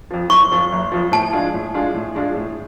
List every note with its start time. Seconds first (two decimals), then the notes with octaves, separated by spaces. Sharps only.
0.11 F2 F3
0.30 F#1 C#6
0.52 F2 F3
0.72 F#1
0.92 F2 F3
1.12 A2 A5
1.33 G#3 D4 F4 G#4
1.54 A2
1.74 G#3 D4 F4 G#4
1.94 A2
2.15 G#3 D4 F4 G#4
2.35 A2